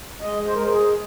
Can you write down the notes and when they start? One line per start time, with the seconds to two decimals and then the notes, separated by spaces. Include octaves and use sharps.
0.21 G#3 D#5
0.46 C5
0.55 A#4
0.58 G#3 C5
0.72 G#4